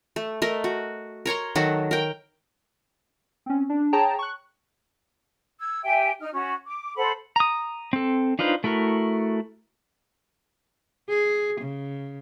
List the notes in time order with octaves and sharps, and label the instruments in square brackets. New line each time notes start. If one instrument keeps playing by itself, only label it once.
[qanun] A3
A3 A#4 D#5
F#4
A#4 C#5 A#5 C6
D#3 F#3 F#4 A4
A#4 G5
[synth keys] C4 C#4
D4
G#4 C#5 G5 A5 A#5
C#6 F#6
[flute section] E6 G#6
G4 E5 G5 G#5
D#4 F6
C#4 F#4
D6
A4 C5 F#5 B5
[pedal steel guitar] A#5 D#6
C4 A4
D4 D#4 F4 B4 C5
A3 E4 F#4 A#4
[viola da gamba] G#4
C#3